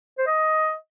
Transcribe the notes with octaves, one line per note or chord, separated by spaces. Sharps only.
C5
D#5